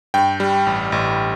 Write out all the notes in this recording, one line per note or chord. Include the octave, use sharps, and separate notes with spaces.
G2 G5
G3
A1
A1